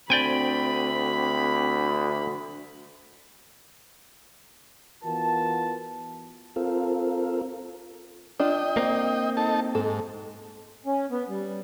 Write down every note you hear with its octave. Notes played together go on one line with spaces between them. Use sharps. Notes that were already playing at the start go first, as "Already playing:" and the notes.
D2 C4 D5 G5 G#5 B5
E3 B3 F4 F#4 A#4 A5
C4 F4 A4 A#4
D4 F4 D#5 G5
A#3 C4
D#4 A4 A5
G#2 A4
C#4
B3
G3